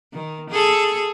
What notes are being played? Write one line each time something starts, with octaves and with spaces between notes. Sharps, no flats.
D#3
G#4 A4